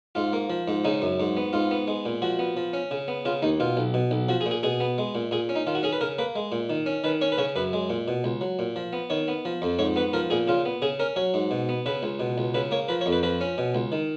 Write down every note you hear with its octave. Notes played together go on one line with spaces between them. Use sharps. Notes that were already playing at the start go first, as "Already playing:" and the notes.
G#2 F4
A#3
F3
G#2
C#3 D#4
F#2
G#2
B3
G#2 F4
B3
G#3
A#2
F3 F#4
B3
F3
C#4
C#3
B3
C#3 F4
D#2 D#4
B2 F4
B1
B2
B1
F3 F#4
G#4
A#2
G#4
B2 G#4
B3
G#3
A#2
A#2 G#4
C#4
D#4
D#3 F4
F#4
C#4 G#4
B4
C#3 A#4
A#3 B4
G#3
A#2
D#3
C#4
D#3 B4
C#4 C#5
B4
C#3 C#5
F#2 B4
G#3
A#2
B2
C#2
F#3
A#2
F3
B3
D#3 C#5
B3
F3
F2
G#2 C#5
B3 B4
F3 A#4
A#2 G#4
C#3 F4
B3
C#3 G#4
C#4 A#4
F#3 C#5
G#2
B2
B3
C#3 B4
C#2
B2
C#2
C#3 B4
A#3 C#5
F3 B4
C#5
F2
B4
F3 B4
C#4
B2
C#2
D#3